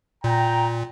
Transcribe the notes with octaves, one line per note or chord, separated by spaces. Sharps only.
A#2 G5 A#5